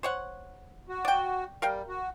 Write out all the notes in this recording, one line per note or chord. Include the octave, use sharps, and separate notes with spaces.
C5 C#5 F#5
F#4
D5 G5
G3 A#4 F5 G5
F#4